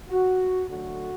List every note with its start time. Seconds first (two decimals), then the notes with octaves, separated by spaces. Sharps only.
0.09 F#4
0.69 D2 D3 F#3 A3 F#4